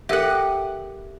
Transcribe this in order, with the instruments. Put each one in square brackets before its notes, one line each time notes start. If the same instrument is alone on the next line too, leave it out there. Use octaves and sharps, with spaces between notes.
[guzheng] G4 F#5 [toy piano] A4 A#4 E5